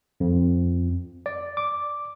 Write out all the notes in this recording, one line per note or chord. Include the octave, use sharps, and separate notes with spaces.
F2
D5
D6